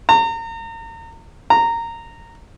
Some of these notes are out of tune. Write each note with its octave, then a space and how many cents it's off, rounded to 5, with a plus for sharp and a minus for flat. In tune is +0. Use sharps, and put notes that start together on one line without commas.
A#5 -35
A#5 -15